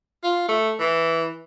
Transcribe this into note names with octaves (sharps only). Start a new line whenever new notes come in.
F4
A3
E3